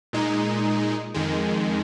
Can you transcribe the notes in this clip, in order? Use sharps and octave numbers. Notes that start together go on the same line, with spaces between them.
A#2 G#3 D#4
F2 D#3 G#3